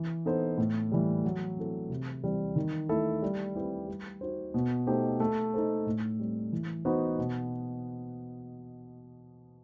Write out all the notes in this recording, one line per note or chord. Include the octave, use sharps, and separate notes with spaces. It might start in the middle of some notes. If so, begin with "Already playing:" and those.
Already playing: E3
B3 D#4 A4 C5
A2
E3 G3
F#3
C4 E4 A4
C3
E3 G3 C4
D#3
A3 E4 A4
G3
C4 E4 G4 B4
G3
D#4 F#4 C5
B2
A3 D#4 G4 C5
A3
D#4 A4 C5
A2
G3 C4
E3
B3 D#4 F#4 C5
B2